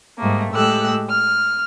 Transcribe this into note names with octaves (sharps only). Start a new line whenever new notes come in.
G#2 G3 A3 A#3
A2 G#3 G4 A4 E6 F#6
F6